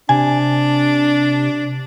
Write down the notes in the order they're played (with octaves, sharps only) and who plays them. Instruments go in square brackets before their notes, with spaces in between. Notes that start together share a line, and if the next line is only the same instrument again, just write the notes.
[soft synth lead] C3 [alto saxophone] D4 [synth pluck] G#5